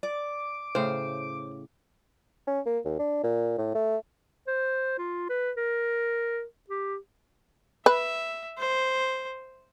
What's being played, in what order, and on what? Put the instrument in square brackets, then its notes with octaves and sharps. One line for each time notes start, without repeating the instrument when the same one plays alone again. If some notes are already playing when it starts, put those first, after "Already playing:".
[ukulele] D5 [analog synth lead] D6
[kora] A2 C#3 F5 [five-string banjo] C5
[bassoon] C#4
A#3
D#2
D4
A#2
A2
A3
[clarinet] C5
F4
B4
A#4
G4
[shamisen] B4 [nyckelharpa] E5
[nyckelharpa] C5